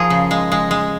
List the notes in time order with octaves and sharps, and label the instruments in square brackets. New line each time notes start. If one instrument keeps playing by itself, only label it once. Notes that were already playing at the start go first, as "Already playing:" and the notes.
Already playing: [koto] F3 G#4 A#4
C#3
G#3
G#3
G#3